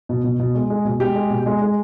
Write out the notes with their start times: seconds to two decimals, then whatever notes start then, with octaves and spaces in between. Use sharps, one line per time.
0.09 B2
0.24 B2
0.39 B2
0.55 G#3
0.70 G#3
0.85 B2
1.00 G#3 G4
1.15 G#3
1.30 B2
1.46 G#3
1.61 G#3